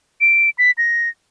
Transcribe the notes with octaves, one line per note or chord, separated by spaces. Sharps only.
D7
B6
A#6